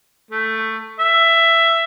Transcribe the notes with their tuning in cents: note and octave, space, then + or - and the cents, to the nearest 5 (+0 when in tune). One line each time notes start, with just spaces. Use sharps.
A3 +10
E5 +10